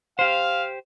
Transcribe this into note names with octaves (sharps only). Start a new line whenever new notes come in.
G4 C5 F5